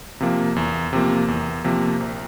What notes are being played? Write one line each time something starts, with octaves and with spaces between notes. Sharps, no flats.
C3 F3 A#3
E2
C3 F3 A#3
E2
C3 F3 A#3
A#1